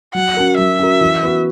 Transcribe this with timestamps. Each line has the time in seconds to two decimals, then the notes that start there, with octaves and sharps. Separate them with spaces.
0.15 F#3 F#5
0.37 C#4 F#4 A#4
0.58 F#3 E5
0.79 C#4 F#4 A#4
1.01 E3
1.23 B3 F#4